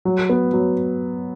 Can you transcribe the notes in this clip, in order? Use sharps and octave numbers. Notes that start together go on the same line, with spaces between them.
F#3
B3
F#3